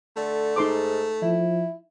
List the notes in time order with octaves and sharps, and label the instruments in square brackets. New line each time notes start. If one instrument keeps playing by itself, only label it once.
[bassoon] D3 [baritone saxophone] A3
[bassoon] G#2 [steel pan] D#4 C6 D6
[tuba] F3 [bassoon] E4